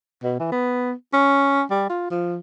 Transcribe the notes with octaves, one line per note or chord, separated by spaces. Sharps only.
B2
E3
B3
C#4
G3
F4
F3